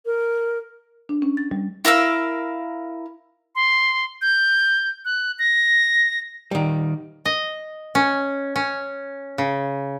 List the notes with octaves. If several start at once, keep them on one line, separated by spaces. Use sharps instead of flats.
A#4
D4
C#4
A6
G3
E4 A#4 F5 E6
C6
G6
F#6
A#6
D#3 G3
D#5
C#4
C#4
C#3